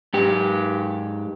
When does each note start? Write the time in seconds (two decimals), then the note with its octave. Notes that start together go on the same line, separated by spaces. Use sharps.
0.14 G#2 G4